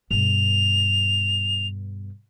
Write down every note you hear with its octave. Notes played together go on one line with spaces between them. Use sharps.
G2 B2 F7